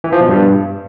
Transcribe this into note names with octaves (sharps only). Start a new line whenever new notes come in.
E3
F3
B2
G2